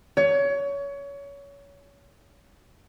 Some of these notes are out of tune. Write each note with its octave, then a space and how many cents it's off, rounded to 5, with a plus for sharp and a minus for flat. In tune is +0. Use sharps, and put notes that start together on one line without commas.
C#5 +25